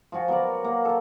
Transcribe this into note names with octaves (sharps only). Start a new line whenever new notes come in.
F3 F4 F#4 G#5
F#3 B3 A#4 D5
A#3
A4 A5